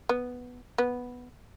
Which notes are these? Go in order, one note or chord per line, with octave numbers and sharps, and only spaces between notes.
B3
B3